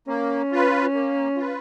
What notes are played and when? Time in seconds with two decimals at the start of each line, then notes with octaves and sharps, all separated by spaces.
0.08 A#3 C#4
0.52 F4 B4
0.94 A#3
1.37 F4 B4